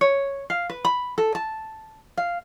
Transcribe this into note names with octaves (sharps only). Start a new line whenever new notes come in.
C#5
F5
B4
B5
A4
A5
F5